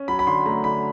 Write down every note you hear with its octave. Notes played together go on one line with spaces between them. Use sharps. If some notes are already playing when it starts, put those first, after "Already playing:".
Already playing: C#4
F#3 B5
B5
D3 C6
A3 A#5
D3 B5